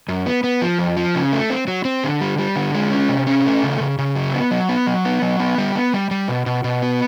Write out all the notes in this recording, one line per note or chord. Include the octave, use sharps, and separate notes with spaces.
F#2
B3
B3
F3
F2
F3
C#3
A3
C4
F#3
C4
D3
G3
G3
D3
G#3
C#4
C3
C#4
A3
C#3
C#3
C#3
F#3
B3
F#3
B3
F#3
B3
F#3
B3
G3
B3
G3
G3
B2
B2
B2
B3